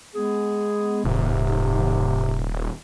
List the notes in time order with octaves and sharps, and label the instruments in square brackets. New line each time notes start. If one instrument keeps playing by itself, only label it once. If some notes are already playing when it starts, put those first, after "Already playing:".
[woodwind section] G#3 B3 G#4
[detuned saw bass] D#1 [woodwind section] G#2 C3